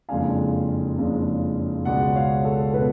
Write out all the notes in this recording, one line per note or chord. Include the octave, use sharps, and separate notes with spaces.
F#1 F2 C#3 G#3 D4 F5 G#5
F#1 F2 C#3 G#3 D4
C#2 B2 G#3 B3 D5 F#5
C#5 F5
A4
B2 B4